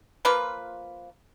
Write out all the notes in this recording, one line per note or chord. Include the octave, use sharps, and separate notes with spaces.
F3 A#3 F4 B4